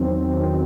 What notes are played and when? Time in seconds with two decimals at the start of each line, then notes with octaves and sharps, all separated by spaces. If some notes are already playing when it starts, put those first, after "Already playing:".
Already playing: E2 D#3 F#3 C4
0.38 E2 D#3 F#3 C4